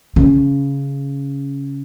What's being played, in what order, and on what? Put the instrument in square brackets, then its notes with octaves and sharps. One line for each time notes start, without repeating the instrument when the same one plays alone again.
[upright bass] C#3